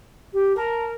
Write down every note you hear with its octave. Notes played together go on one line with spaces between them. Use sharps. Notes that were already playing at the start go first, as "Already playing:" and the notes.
G4
A#4 A5 A#5